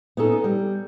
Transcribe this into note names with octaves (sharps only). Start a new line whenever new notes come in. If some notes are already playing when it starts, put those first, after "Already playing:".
B3 C#4 D#4 A4
G3